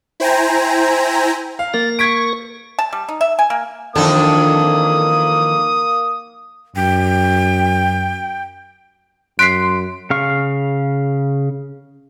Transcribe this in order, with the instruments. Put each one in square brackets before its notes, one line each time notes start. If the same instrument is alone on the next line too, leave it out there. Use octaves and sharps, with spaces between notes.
[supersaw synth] E4 C5 G5 G#5 A#5
[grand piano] F5
[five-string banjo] A#3 [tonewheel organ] A#4 [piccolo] A6
[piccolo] C#6 [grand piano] G#6 B6 D7
[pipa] A5
G3
D#4
E5
G#5
A#3
[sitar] F2 D4 A4 [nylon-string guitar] D#3 E3 [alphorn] A#3 [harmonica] D#6
[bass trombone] F#2 [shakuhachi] G5
[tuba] F#2 [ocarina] C6 [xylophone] F#6 B6 C7 [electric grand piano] D7
[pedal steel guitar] C#3 F5 C#6